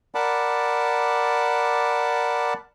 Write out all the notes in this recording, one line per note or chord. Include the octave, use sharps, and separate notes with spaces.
A#4 D5 F#5 A5 B5 D6